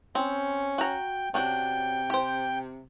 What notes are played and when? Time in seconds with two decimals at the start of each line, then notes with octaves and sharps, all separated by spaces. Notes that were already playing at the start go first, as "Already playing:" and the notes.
0.15 C4 C#4
0.78 F#4 G5 A#5
1.34 C3 C#4 D4 F#4 G5
2.10 G4 C5